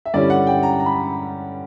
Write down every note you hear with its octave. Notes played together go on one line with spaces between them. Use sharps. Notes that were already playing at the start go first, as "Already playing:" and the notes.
E5
G2 D3 G3 C#4 E4 D5
F#5
G5
A#5
A#5
B5